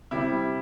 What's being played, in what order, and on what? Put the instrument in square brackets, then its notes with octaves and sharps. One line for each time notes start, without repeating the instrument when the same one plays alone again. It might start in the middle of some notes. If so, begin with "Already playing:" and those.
[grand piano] C3 G3 E4